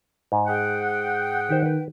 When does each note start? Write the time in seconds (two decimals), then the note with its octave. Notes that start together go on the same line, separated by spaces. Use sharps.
0.32 G#2
0.47 G#4 F#5 G5
1.50 D#3 G4 C5
1.66 B4